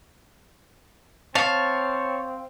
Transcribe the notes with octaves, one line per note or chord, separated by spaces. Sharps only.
C4 C#5 F5 A5